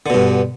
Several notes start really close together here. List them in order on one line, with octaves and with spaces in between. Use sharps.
D3 B2 G2